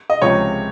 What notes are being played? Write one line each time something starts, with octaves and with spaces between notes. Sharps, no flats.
D#5
C#2 C3 F3 G#3 C#5